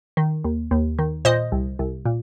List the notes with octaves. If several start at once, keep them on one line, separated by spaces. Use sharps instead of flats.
D#3
D#2
D#2
D#3
A#2 C5 D#5
C2
C2
A#2